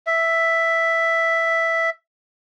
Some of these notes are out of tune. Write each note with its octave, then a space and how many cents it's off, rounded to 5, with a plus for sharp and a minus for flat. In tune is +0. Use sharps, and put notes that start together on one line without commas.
E5 +5